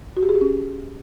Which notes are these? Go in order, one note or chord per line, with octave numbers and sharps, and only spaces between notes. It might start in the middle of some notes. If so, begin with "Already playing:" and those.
F#4
G4
G#4
G4
C#4